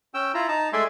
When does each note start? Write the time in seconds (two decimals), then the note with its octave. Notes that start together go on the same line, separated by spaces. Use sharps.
0.14 C#4 G5 E6
0.34 E4 F4 A#5
0.48 D#4 A5 A#5
0.73 G#3 A3 D5 E5 G#5 C6